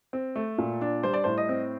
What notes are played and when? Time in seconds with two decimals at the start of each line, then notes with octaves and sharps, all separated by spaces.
0.13 C4
0.36 A3
0.58 A#2
0.81 D4
1.03 G3 C5
1.14 D5
1.24 A2 C5
1.38 D#5
1.49 C4